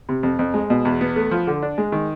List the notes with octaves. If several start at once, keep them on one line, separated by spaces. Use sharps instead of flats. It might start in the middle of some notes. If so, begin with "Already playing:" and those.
C3
F2
F2
G#3
B2
E2
B3
A3
F3
D3
D4
G#3
D#3